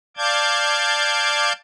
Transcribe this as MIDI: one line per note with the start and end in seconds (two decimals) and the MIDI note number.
0.17 1.53 74
0.17 1.53 77
0.17 1.53 81
0.17 1.53 86
0.17 1.53 91
0.17 1.53 92